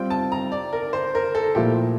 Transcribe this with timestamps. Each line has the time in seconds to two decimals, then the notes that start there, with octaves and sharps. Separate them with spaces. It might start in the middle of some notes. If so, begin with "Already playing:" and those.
Already playing: G3 C4 F4 G5
0.10 A5
0.32 A#5
0.52 D5
0.73 A#4
0.93 C5
1.15 A#4
1.35 A4
1.55 A#2 F3 A3 E4 G4